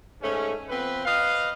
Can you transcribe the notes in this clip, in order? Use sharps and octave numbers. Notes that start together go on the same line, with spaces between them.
G#2 A3 C#4
F3 B3 C4 B4
B4 D#5 F5